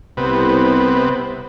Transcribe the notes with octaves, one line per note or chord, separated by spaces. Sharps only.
C2 C3 B3